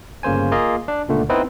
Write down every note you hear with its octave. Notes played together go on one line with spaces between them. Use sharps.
G1 C#3 A#3 C5 G#5
A#3 F4 G#4 D#5 F5
D4
C#2 A#2 D3 A3
B3 C4 D#4 E4 B4